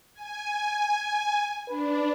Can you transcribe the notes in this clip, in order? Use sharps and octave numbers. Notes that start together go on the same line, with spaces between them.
G#5
D4 B4